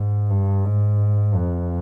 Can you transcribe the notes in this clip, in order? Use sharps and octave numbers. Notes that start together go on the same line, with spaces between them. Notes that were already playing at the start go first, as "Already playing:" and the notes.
Already playing: G#2
G2
G#2
F2